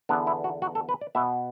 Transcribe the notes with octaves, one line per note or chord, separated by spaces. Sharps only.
E2 D3 B3 D4
E4
F#4
F#4
A4
B4
D5
B2 B3 E5